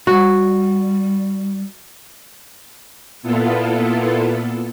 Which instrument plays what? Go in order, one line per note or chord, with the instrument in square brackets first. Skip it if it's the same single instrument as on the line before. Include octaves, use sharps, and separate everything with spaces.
[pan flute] G3 [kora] F#4
[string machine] A#2 B3 E4 F4 A4